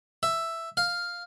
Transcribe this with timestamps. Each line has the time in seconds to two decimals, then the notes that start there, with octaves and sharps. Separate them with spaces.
0.23 E5
0.77 F5